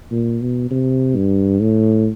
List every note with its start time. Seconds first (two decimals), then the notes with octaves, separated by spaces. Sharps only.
0.11 A#2
0.41 B2
0.71 C3
1.16 G2
1.61 A2